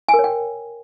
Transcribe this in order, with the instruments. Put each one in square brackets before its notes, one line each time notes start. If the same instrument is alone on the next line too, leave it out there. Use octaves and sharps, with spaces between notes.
[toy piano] G#5
A#4
C#5
G5